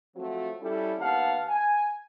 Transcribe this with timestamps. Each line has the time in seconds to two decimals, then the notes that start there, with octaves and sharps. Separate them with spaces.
0.16 F3 F#3 A3 C4 F#4
0.61 G3 C#4 E4 A4
0.99 D#2 B3 F5 F#5 A5
1.48 G#5